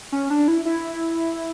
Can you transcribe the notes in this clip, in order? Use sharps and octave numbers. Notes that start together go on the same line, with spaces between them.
C#4
D4
E4
E4